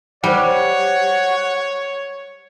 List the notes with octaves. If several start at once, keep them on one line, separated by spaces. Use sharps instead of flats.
G3 C5 C#5 F#5 G5